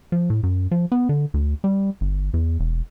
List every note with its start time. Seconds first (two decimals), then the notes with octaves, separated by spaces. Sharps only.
0.12 F3
0.30 A2
0.43 F#2
0.71 F3
0.92 B3
1.09 D3
1.34 D2
1.64 G3
2.01 G1
2.34 E2
2.60 E1